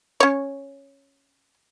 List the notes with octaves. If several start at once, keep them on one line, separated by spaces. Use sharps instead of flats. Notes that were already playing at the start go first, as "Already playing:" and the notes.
C#4 C#5